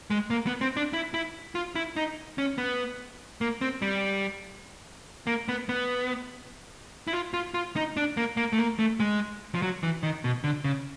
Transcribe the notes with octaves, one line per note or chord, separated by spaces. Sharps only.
G#3
A#3
B3
C4
D4
E4
E4
F4
E4
D#4
C#4
B3
A#3
C4
G3
A#3
B3
B3
E4
F4
F4
F4
D#4
D4
A#3
A#3
A3
A#3
A3
G#3
F3
F#3
E3
D#3
B2
D3
C#3